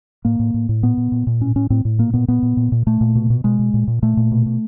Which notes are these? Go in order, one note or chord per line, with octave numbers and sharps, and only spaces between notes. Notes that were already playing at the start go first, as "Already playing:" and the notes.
A2 A#3
A2
A2
A2
A#2 B3
A#2
A#2
A#2
A2 C#4
A2 C#4
A2 C4
A2
A#2 A#3
A#2 B3
A#2 B3
A#2
A#2
A#2
A#2 A3
A#2
B2
B2
B2 G#3
B2
A#2
A#2
A#2 A3
A#2
B2
B2